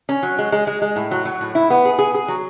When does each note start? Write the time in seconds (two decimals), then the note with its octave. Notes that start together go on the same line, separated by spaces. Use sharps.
0.09 C#4
0.23 F#3
0.39 G#3
0.52 G#3
0.67 G#3
0.82 G#3
0.96 A2
1.11 F#3
1.25 F#3
1.41 A2
1.55 E4
1.70 B3
1.85 G#4
1.98 G#4
2.14 G#4
2.28 F#3